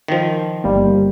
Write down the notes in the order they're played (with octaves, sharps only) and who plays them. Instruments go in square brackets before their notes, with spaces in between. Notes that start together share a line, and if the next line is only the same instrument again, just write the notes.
[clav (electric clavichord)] D#3 F3
[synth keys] G1 G3 A#3